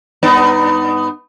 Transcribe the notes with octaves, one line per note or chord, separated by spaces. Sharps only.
G2 B3 D#4